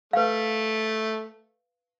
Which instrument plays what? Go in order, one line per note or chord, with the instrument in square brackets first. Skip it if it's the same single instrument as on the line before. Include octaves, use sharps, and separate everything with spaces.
[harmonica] A3 [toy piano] B4 F5